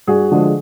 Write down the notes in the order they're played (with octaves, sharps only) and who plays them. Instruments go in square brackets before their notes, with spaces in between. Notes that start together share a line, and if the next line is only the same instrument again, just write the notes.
[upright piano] G2 F#4 G#4
D3 F3 G#3